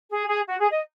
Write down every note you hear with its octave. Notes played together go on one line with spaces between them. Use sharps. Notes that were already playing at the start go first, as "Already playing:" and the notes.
G#4
G#4
F#4
G#4
D#5